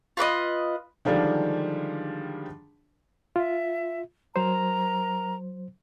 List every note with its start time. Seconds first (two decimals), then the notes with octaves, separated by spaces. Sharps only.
0.17 F4 B4 D5 D#5
1.05 D3 D#3 F3 G3 G#3 D4
3.36 F4 E5
4.36 F#3 A#4 C5 A#5